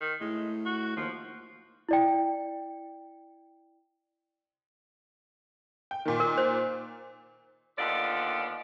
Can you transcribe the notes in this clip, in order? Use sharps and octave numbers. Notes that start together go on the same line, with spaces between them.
D#3
A2 G#3
F#4
D#2 F3
E4 D5 G5
G5
A#2 D#3
A#4
C5
D#2 D3 B3 F4 D5